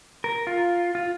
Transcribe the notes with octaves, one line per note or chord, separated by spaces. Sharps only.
A#4
F4
F4